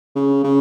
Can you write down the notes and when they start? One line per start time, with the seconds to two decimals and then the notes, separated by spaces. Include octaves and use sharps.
0.15 C#3
0.44 C#3